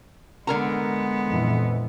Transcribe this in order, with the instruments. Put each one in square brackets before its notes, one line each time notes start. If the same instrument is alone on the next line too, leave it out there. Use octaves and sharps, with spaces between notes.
[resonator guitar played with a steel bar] D3 A#4 A#5 [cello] G#3 B3
[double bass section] F2 A#2 E3